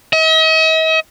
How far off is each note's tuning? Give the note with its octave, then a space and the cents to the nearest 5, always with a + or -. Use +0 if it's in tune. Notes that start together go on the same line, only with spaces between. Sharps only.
D#5 +45